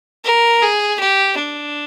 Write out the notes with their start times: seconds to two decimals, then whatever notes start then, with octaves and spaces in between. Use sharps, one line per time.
0.25 A#4
0.62 G#4
1.00 G4
1.38 D4